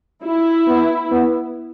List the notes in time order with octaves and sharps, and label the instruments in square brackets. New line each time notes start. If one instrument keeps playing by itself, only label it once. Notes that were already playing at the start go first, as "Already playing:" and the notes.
[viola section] E4
[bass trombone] B3
B3